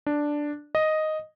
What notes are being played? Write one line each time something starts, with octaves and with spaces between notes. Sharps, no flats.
D4
D#5